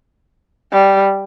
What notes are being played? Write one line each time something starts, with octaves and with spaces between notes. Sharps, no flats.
G3